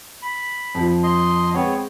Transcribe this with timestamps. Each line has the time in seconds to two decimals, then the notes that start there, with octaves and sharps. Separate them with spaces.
0.22 B5
0.75 F2 F3
1.03 D#5 C6
1.54 G#3 B3 C4 C#5